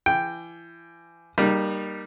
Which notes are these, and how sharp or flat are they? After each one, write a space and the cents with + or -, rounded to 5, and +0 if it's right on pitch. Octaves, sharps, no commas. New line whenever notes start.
E3 +35 G5 +0
G3 -5 A#3 +0 D#4 -30